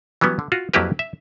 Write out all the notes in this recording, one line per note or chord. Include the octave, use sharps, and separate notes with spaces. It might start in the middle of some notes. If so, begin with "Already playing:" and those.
E3 F#3 G3 B3 C#4
D3
F4 F#4
F2 F#3 A#3 E4 G4 B4
E5